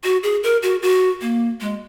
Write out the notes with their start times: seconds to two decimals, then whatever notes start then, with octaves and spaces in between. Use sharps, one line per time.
0.04 F#4
0.23 G#4
0.43 A#4
0.62 F#4
0.82 F#4
1.21 A#3
1.61 G#3